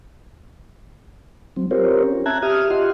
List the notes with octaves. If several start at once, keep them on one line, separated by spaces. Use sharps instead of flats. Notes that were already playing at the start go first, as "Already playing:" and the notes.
F#3 C4
C4 F4 G4 A#4 C5 C#5
C#4
E5 A5 A#5 F#6 G#6
G4 E5 D#6 F6
F4 G4 D#5 F#5 C6